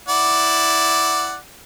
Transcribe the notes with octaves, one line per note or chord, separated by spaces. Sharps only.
E4 D5 F#5